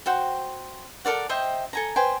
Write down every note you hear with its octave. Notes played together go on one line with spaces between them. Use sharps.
F#4 C5 G5
A4 A#4 D5 F#5
C5 D#5 E5 G5
A4 G#5 A#5
B4 C5 G5 G#5